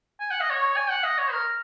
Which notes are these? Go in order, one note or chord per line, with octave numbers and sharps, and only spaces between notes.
G#5
F#5
D#5
C#5
G#5
F#5
D#5
C#5
A#4